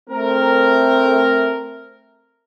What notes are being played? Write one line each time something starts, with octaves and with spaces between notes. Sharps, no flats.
A3 C4 A#4